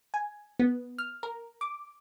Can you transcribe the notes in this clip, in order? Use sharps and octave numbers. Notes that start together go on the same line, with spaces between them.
G#5
B3
F6
A#4
D6